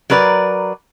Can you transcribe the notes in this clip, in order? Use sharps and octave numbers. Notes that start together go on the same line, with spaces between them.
F#3 A#4 B4 D5